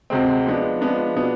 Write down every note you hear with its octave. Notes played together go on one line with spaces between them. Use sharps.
D2 C3 G#3 C4
F3 G#3 B3 D4
F3 G#3 B3 D4
B2 B3 D4